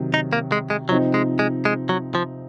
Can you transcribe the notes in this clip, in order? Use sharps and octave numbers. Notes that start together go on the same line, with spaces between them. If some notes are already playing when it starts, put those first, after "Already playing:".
Already playing: C3 D#3 F#3
D#4
A#3
G#3
G#3
C3 F3 F#3 C4 D#4
G#3
G#3
G#3
F#3
F3